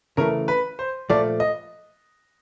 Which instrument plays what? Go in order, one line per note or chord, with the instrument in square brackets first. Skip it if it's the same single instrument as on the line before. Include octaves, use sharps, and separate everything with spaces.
[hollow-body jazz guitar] C#3 E3 A3 [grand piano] A#4
[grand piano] B4
C5
[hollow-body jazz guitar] A#2 F3 A3 [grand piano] D5
[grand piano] D#5